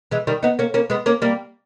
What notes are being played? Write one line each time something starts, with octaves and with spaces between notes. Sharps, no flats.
E3 G#3
D#3 G3
B3 D#4
A#3 C#4
A#3 C#4
G#3 B3
A#3 C#4
G3 A#3